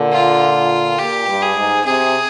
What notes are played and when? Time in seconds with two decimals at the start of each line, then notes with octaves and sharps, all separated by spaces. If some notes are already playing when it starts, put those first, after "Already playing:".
Already playing: A#2 D3
0.12 F4
0.99 A#2 G4
1.27 G2
1.42 G#4
1.56 G#2
1.85 C3 G#4